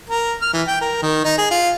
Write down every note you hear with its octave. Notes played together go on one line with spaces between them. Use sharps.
A#4
F6
E3
G5
A#4
D#3
D#4
G#4
F4